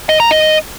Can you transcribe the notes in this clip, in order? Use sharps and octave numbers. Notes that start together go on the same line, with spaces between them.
D#5
A#5
D#5